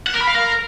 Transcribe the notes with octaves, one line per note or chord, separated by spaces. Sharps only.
F#5
A#4
B5
F5
A#4